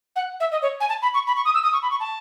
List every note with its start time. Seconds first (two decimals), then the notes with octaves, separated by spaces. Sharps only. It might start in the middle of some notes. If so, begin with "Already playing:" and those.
0.15 F#5
0.40 E5
0.51 D#5
0.62 C#5
0.80 G#5
0.88 A5
1.02 B5
1.14 C#6
1.27 B5
1.36 C#6
1.45 D#6
1.54 E6
1.63 D#6
1.73 C#6
1.82 B5
1.90 C#6
2.00 A5